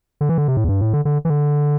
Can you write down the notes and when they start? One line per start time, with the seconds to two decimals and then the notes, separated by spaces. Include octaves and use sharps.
0.21 D3
0.29 E3
0.38 D3
0.48 C3
0.57 A2
0.64 E2
0.69 G2
0.81 A2
0.93 D3
1.05 D3
1.25 E3
1.30 D3